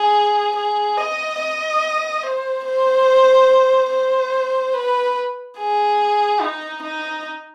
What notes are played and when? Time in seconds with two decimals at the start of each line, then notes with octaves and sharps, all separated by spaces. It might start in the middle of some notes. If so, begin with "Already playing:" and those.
Already playing: G#4
0.56 G#4
0.97 D#5
1.40 D#5
2.23 C5
2.65 C5
3.90 C5
4.74 B4
5.58 G#4
6.41 D#4
6.82 D#4